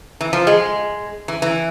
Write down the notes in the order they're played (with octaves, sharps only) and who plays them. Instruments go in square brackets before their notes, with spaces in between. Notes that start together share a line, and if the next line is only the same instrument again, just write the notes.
[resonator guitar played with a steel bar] E3
F3
G#3
E3
E3